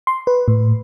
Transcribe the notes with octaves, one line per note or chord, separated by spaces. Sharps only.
C6
B4
A2